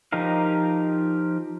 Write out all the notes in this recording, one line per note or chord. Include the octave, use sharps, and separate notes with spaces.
F3 D#4 G4 A#4 F5